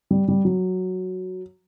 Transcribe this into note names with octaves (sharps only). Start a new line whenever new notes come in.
G3
G3
F#3